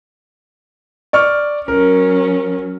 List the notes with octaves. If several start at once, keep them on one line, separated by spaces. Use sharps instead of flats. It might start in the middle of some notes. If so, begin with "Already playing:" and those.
D5 C#6 F6
F#3 C#4 A#4